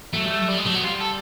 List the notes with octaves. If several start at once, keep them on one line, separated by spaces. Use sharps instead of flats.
F#3 A3
G3
F#3
G3
G#3
F#3 A3
B3
G3 F4
A4